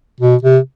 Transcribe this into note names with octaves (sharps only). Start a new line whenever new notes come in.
B2
C3